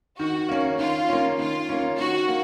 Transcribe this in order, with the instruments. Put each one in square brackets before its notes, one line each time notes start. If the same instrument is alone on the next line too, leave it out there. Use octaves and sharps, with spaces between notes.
[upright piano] D#3 [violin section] F#4
[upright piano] A#3 C#4
[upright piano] D#3 [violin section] F4
[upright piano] A#3 C#4
[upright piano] D#3 [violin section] F4
[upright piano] A#3 C#4
[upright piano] D#3 [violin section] F#4
[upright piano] A#3